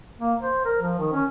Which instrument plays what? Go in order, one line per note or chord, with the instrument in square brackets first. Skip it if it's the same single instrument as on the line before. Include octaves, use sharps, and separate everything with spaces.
[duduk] A#3
C5
A#4
F3
D#3
C#4